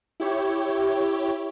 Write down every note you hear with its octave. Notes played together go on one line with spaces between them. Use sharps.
E4 G4 C#5